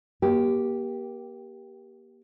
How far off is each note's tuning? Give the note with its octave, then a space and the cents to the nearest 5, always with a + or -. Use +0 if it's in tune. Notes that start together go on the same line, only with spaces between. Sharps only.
A#3 +30 G4 +0